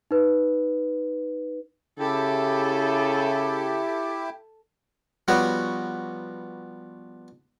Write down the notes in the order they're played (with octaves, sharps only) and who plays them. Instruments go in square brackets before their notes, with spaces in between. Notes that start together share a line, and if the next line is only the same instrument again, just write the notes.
[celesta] D#4 B4
[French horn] C#3 [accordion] E4 G4 [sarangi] A4
[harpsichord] F3 G3 B3 F#4 C#5